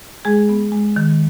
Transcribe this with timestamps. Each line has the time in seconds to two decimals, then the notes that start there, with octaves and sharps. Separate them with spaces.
0.25 G#3 G#4
0.49 B3
0.72 G#3
0.96 D#3